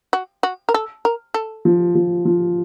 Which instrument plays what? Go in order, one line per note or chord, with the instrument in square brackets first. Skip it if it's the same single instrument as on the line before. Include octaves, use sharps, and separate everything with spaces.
[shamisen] F#4
F#4
A#4
A4
A#4
A4
[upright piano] F3
F3
F3